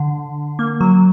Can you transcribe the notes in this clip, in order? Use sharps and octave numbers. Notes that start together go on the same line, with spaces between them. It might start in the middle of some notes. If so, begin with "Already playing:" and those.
Already playing: D3
A#3
F#3